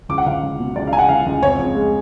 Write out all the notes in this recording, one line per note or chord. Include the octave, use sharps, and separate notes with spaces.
C#2 D6
F#5
C#2 F5
C#2
B2
C#2 D5
F5
C#2 G#5
F#5
C#2 F5
C#2
F2 C#5
F2
G#3